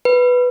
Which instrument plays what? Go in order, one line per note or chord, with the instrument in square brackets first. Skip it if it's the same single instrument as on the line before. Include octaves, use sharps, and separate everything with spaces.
[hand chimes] B4